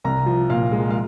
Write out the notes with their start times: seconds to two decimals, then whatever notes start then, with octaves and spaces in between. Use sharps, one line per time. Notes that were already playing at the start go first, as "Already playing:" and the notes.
0.04 C2 A#5
0.26 F3
0.50 A#2 F5
0.72 G#3
0.90 F5